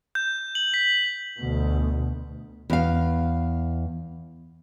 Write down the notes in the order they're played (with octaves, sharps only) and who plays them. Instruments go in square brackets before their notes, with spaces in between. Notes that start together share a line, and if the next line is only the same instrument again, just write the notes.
[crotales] G6
F#7
B6
[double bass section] D2 B2
[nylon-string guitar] E2 F5